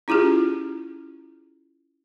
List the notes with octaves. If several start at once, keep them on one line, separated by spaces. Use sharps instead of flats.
C#4 E4 F4 G4 G#4